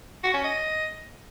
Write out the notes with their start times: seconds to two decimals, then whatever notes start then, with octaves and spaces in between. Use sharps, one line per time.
0.23 F#4
0.34 C#4
0.44 D#5